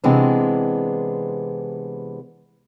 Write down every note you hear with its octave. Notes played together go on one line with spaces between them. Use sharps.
C3 E3 G#3 B3 C4 D4